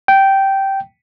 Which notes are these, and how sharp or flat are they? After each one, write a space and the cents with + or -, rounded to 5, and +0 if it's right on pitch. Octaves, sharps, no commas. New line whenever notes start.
G5 -10